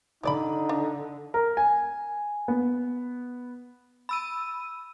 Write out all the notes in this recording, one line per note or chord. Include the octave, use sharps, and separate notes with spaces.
D3 G3 D#4 D5 B5
D4
A#4
G#5
B3
B5 E6 D#7